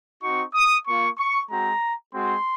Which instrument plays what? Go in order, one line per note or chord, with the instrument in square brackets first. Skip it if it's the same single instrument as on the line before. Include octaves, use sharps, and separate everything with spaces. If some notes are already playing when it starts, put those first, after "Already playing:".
[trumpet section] C4 D#4 F#4 C#6
D#6
A#3 F4 C#6
C#6
G#3 C4 F#4 A#5
G#3 C4 F#4 C6